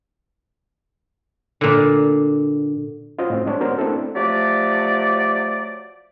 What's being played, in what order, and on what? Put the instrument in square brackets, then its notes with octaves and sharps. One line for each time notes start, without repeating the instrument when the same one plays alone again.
[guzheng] A#2 D3
[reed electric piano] C#4 F4 F#4 C5 D#5
A2 C4
G#3 D4 C5 C#5
B3 C#4 F#4 A#4 C5
A3 A#3 C4 D4 E4 A4
[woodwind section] F3 F#3 A3 G4 D5